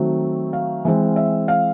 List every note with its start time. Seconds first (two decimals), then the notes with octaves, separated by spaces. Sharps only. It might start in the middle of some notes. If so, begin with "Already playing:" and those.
Already playing: D#3 F#3 A3 C4
0.53 F5
0.85 E3 G#3 C4
1.16 E5
1.48 F5